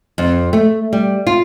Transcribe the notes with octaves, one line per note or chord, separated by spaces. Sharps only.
F2
A3
G3
F4